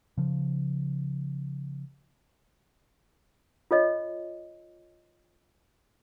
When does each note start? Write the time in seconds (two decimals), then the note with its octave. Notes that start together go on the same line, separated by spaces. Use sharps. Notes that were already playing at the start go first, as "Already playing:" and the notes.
0.18 C#3 F3
3.71 F4 A4 C#5 D#5